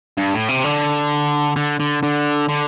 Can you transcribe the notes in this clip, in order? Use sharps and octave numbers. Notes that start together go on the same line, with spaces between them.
G2
A2
C3
D3
D3
D3
D3
D3